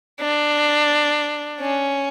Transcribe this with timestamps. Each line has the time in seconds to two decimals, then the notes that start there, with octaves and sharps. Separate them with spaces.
0.20 D4
1.60 C#4